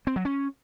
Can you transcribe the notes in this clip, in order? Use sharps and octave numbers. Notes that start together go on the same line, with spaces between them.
C4
F#3
C#4